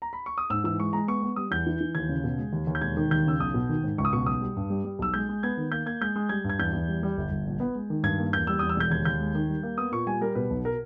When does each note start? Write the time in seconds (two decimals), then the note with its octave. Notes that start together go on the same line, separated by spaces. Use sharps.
0.02 A#5
0.13 B5
0.26 C#6
0.38 D#6
0.50 G#2 E6
0.64 E3 E6
0.80 G#3 C#6
0.93 G#3 A#5
1.08 B3 C#6
1.23 B3
1.36 G3 D#6
1.51 E2 G6
1.67 E3
1.81 E3
1.95 D#2 G#6
2.09 C#3
2.24 B2
2.38 G#3
2.53 D#2
2.67 D#2
2.75 G6
2.81 E1 G#6
2.97 D#3
3.11 D#2 G6
3.26 C#3 E6
3.40 B1 D#6
3.54 B2
3.69 D#3
3.84 G#2
3.98 C#2 C#6
4.05 D#6
4.13 B2 C#6
4.26 B1 D#6
4.41 G3
4.57 G2
4.70 G3
4.85 G3
4.99 B1 E6
5.14 G#3 G6
5.29 G#3
5.43 B3 G#6
5.57 D#3
5.72 A#3 G6
5.86 A#3 G#6
6.01 G#3 G6
6.16 G#3
6.29 G3 G#6
6.44 G2
6.50 G#6
6.59 E2 G6
6.73 E2
6.88 G3
7.03 G3
7.17 G1
7.31 G1
7.46 A#1
7.60 B3
7.75 G#3
7.90 D#3
8.03 G2 G#6
8.18 A#3
8.33 E2 G6
8.47 G3 E6
8.59 E2 D#6
8.69 E6
8.77 E1 G6
8.90 D#2 G#6
9.05 D#2 G6
9.20 G#3
9.35 D#3
9.48 G3
9.63 A#3
9.78 B3 D#6
9.92 A#2 C#6
10.07 G3 G#5
10.21 G3 A#4
10.35 B2 B4
10.50 B1
10.65 A#4